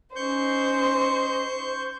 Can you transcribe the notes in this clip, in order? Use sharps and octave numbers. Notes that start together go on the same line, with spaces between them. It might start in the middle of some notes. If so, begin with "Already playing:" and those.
C#4 D#4 C5 C#6 G6